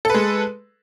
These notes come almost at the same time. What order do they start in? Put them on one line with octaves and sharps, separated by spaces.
A4 B4 G#3